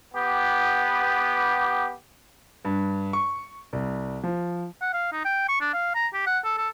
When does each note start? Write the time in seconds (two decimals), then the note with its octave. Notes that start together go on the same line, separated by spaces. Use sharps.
0.14 B3 G4
2.65 G2
3.13 C#6
3.73 C2
4.24 F3
4.82 F#5
4.94 F5
5.12 D#4
5.25 G5
5.49 C#6
5.61 D4
5.74 F5
5.95 A#5
6.14 G4
6.27 F#5
6.44 A4
6.58 A4